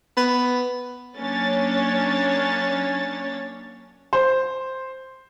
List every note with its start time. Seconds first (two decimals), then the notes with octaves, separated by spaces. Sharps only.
0.17 B3
1.18 F#3 A#3 C#4 D4 C#5 A6
4.13 C5